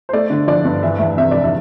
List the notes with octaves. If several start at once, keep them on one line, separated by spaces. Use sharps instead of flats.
C5
A3 D5
D3
F3 D5
G2
E3 E5
E2 E5
C3 E5
F1 D5
E5